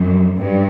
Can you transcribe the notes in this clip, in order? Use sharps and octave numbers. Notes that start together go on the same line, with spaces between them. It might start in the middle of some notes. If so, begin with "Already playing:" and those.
Already playing: F#2
G2